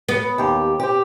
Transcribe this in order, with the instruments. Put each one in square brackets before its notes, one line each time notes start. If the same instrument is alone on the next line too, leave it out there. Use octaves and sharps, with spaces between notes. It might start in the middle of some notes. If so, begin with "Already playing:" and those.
[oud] B3
[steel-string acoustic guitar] D#2 G4
G4 C5